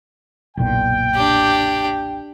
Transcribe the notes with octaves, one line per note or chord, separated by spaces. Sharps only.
F#1 B1 A#2 G5
D4 G4